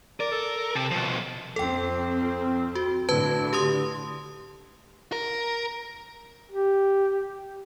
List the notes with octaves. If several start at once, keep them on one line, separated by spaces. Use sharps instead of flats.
A#4 D5
A4
C3 A5
B2 F3
F2 C4 A4 G5
F#4
A2 D3 B4 A5 G#6
G4 C6 D#6
A#4
G4